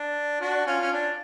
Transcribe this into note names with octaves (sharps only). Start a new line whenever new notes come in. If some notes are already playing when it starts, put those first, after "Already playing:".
Already playing: D4
D4 F#4
C#4 F4
C#4
D4